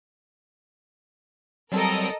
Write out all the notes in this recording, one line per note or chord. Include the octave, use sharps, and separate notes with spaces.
F#3 G3 C4 A4 A#4 D#5